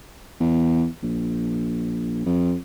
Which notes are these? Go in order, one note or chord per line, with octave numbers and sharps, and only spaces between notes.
E2
A#1
F2